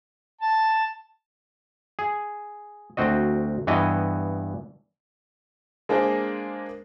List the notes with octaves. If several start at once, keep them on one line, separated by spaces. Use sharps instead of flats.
A5
G#4
D2 C4 F#4 D#5
G2 E3 B3 D#5
G#3 A#3 D4 G#4 C5